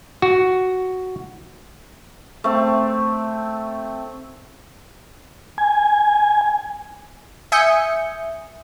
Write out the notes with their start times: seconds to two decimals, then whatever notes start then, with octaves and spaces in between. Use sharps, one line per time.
0.22 F#4
2.44 A3 C4
5.58 G#5
7.52 E5 G#5 D#6 G6 C#7